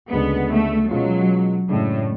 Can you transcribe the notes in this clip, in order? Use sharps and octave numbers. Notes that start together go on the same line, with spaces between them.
D2 C#3 G#3 B3 D4
A3
B2 F#3 G#3 C#4 F4
F#2 A2 C#3 G#3 D4